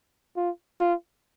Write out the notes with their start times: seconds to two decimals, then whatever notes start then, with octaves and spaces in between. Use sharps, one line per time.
0.37 F4
0.80 F4